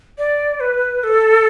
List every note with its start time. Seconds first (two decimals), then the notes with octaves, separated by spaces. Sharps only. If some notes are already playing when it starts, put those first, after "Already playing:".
0.18 D5
0.60 B4
1.04 A4